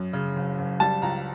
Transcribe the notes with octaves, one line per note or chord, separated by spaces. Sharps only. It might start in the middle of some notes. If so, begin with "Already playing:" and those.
Already playing: F#2
C#3
F#1
F#1
G3 A5
C#2 A#5